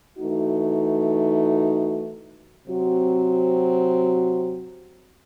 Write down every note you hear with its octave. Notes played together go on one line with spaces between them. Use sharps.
E3 A3 D#4 F#4
C3 F#3 C4 F#4